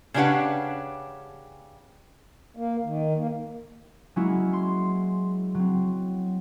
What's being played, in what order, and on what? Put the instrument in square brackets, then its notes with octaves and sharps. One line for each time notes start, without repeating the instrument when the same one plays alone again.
[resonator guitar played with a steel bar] C#3 C#4 D4 G4 B4 F#5
[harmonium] A#3
D#3
A#3
[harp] F#3 G#3 A#3 C#4 E4 F#4
C6
F#3 C4